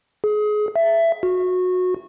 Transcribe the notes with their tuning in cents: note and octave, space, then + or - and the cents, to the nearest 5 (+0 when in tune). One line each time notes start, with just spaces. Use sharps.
G#4 +25
E5 +15
F#4 -20